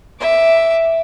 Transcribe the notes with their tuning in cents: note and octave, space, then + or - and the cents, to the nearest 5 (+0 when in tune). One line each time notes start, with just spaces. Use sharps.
E5 +0 D6 +0